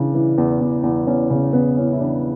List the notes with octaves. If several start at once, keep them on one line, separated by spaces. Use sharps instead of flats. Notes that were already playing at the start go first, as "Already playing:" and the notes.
Already playing: C#3 E3 D4
E3
E2
E2
E2
E2 C#4
C#3 C#4
E2 B3
E3 C#4
E4
E2 D4